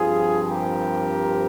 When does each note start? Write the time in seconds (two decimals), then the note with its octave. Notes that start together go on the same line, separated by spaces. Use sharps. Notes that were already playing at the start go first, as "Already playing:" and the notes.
Already playing: G2 F3 C4 F4 G#4
0.47 G4 A#4